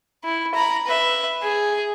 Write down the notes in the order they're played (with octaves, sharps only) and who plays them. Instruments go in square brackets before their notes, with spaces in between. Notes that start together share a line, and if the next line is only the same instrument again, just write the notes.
[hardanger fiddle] E4
A#5 B5
B4 E5
G#4